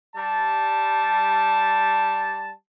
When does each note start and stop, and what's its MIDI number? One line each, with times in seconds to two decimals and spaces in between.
0.16 2.52 55
0.16 2.52 81